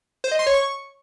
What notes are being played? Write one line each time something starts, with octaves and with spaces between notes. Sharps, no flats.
C5
D#5
C6
C#5
C#6